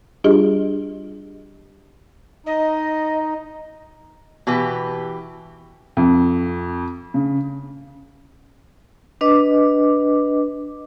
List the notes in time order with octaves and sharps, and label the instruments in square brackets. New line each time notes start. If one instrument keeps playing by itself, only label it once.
[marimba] G3 D4 F4 G4 G#4 D#5
[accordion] D#4 [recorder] D#5
[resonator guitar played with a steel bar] B2 E3 G4 B4
[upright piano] F2
C#3
[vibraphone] D4 B4 D#5 D6